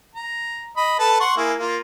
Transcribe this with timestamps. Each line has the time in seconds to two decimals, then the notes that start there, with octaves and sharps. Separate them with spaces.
0.15 A#5
0.77 D#5 B5
0.99 A4 B4 A5
1.20 F#5 C6 C#6
1.37 A#3 E4 G#4
1.59 A#3 F4